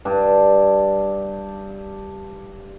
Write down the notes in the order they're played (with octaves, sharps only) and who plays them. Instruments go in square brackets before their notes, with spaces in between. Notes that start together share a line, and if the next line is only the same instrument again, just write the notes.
[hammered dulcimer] G2 D4 G5 A5